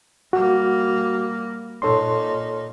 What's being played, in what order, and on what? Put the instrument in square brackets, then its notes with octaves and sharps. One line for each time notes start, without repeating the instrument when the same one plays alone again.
[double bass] G3 A#3 [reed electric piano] F#4
[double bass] A#2 D#4 [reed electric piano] A4 C#5 C6